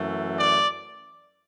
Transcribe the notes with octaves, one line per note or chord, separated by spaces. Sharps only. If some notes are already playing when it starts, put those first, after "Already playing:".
Already playing: F#2 E3 A3
D5